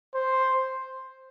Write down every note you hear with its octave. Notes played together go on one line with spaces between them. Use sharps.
C5